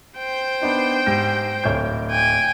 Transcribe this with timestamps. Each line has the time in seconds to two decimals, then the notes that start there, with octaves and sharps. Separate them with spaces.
0.18 C5 G5
0.61 B3 D4 D#4
1.06 G#2 G4 A#6
1.64 D1 C#5 G6
2.11 G5 G#5